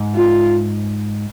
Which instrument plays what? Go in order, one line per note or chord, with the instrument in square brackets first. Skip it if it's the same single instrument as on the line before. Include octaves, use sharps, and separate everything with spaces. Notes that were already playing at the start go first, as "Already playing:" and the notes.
Already playing: [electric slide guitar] G#2
[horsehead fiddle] F4